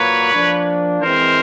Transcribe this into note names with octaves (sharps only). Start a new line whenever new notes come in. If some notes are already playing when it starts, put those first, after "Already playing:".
Already playing: A#2 F#3 A#3 B4 C#5
F3 A#3 D4
E3 G#3 C4 A#4 C5